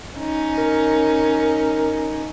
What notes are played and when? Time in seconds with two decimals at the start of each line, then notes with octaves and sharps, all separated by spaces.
0.17 C#4 D#4
0.58 A#4